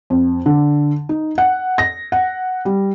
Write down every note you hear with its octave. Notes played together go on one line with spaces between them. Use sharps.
F2
D3
D#4
F#5
A#6
F#5
G3